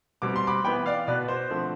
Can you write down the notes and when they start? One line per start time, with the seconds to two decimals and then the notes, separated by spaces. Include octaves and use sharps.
0.22 B2 G3 C4 D6
0.36 C6
0.47 B5 D6
0.64 E3 B3 G5 B5
0.86 D5 F5
1.07 B2 B3 B4 D5
1.28 C5
1.51 D3 F3 A3 C4